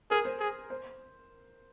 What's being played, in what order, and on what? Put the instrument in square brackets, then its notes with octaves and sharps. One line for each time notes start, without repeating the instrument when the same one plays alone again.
[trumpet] G#4 [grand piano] A#4
[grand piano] C5
[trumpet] G#4
[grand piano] C5